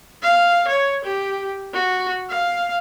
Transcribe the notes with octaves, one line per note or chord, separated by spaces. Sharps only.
F5
C#5
G4
F#4
F5